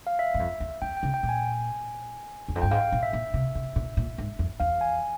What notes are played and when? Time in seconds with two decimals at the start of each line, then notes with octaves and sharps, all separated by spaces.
0.07 F5
0.19 E5
0.34 G2
0.39 F2
0.60 E2
0.82 F2 G5
0.97 G5
1.03 C#3
1.14 G5
1.23 A#2
1.29 G#5
2.48 E2
2.55 F2
2.62 G2 G5
2.71 G#2 F5
2.92 A#2
3.03 E5
3.13 A#2
3.34 C3
3.55 C3
3.76 A#2
3.97 A#2
4.18 G#2
4.39 F2
4.60 E2 F5
4.81 G#5